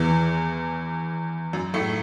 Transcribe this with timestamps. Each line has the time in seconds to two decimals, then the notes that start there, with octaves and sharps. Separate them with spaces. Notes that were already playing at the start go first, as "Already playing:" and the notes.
Already playing: E2 E3
1.53 F#2 F#3
1.74 A2 A3